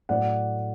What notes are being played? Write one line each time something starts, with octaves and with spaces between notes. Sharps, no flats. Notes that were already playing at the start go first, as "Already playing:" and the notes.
A2 F#3 A3 D5 F#5